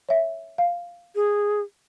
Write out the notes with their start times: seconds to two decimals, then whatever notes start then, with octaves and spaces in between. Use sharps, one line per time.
0.09 C#5 E5
0.58 F5
1.15 G#4